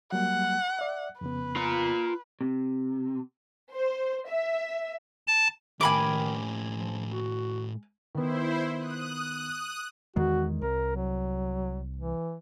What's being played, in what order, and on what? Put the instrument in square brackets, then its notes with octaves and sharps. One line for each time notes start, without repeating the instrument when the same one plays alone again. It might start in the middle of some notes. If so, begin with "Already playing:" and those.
[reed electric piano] F#3 G3 A#3 [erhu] F#5
[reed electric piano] D5 E5
[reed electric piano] F2 C#3 B3 [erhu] B4
[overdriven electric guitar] F4 A#5
[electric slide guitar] C3
[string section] C5
E5
[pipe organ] A5
[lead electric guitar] A2 G4 [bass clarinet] D#3 [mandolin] G#5 B5 D6
[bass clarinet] F3
F#4
[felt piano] D#3 B3 [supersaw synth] E4 C5
[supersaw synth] D#6 F#6
[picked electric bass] E2 D#3 G#3 [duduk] F#4
[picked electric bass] C2 [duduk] A#4
[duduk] F#3
E3